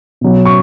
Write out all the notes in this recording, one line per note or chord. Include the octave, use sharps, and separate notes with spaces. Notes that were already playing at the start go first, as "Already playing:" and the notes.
B2 F#3
C#6